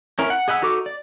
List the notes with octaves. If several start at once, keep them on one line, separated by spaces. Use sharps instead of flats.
C#4 E4 A#4
F#5
G#4 D#5 F#5 B5 E6
D#4 F#4 A4 D6
D5